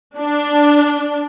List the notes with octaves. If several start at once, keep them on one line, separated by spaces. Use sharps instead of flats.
D4